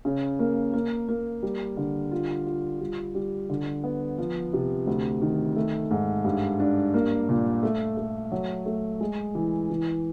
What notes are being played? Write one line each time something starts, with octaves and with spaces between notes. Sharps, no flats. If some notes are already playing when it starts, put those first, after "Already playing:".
C#3
A#3
A#3
A#3
G3
D3
F4
F4
G3
G3
D3
B3
F3
C3
D2
D#3
A3
G#2
G2
D4
A#3
A#2
A3
A3
F#3
A3
G#3
E3
E3